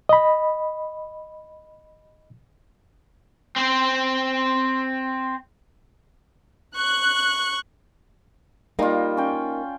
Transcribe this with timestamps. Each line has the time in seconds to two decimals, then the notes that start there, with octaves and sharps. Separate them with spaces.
0.09 D#5 B5
3.56 C4 C5
6.76 C#6 F#6
8.79 G3 A#3 D#4 F4
9.17 C#4 G5